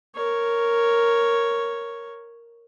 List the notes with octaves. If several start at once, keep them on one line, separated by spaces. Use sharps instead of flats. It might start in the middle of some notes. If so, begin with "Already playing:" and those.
A#4 C#5